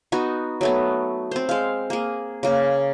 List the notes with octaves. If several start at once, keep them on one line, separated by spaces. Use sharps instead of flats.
B3 D#4 F#4
F#3 A3 B3
C4 C5
G#3 F5
A#3 G#4
C#3 A#3